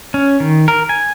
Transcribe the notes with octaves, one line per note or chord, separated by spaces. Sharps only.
C#4
D#3
A#4
G#5